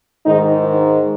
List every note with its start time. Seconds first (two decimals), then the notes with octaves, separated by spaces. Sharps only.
0.25 G#2 D#3 D#4
0.63 D#4